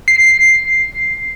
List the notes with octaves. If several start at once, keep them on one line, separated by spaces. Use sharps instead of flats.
C7